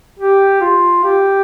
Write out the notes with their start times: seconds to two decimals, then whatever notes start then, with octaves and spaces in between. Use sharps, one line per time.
0.19 G4
0.61 F4
1.04 G4